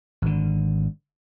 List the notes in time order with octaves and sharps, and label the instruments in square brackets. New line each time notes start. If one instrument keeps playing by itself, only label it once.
[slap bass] G#1 D3